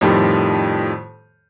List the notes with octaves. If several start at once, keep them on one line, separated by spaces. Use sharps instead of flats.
F2 A2 D#3 F3 G3